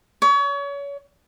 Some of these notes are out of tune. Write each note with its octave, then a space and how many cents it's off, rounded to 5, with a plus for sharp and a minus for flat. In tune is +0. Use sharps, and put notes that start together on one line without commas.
C#5 +30